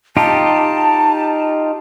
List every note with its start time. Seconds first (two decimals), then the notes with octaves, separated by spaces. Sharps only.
0.17 D#4 F4 G4 A5